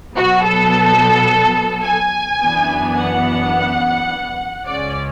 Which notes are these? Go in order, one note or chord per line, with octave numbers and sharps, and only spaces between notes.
B2 F#3 B3 F#4
A4
G#5
F#2 E3 B3 D4
F#5
C#2 C#3 G#3 C#4 D5